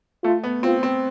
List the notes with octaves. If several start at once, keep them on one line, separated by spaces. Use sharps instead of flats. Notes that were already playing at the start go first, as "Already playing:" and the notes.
A3 F4
B3
C4 F4
C4